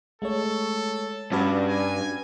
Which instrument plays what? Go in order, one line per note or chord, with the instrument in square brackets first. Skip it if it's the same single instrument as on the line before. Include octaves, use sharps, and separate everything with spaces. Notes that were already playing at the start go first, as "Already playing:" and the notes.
[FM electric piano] G#3 A3 C#5 [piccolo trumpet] A4
[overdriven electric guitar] G2 [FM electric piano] C#4 F#4 B4
[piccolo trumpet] G#5